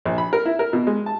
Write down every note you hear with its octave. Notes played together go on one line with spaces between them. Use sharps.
A#1
B5
A#4
E4
A#4
B2
G#3
A5